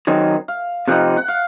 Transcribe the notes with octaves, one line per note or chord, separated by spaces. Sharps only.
D#3 F#3 C4 D#4
F5
C3 F3 C4 D#4 F#5
F#5
F5